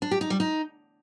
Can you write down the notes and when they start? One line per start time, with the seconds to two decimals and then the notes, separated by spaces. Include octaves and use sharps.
0.02 D4
0.11 G4
0.21 D#4
0.30 G3
0.40 D#4